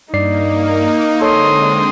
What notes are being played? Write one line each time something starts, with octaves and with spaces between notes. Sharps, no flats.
G2 A#3 D#4 D5 C7
D3 G#3 C4 A4 C#5 C6 D#6